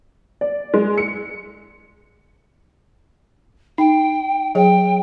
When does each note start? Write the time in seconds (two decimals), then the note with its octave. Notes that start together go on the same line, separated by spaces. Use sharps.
0.41 D5
0.74 G#3
0.98 C#7
3.78 D#4 G5
4.55 F#3 G#4 C#5 G5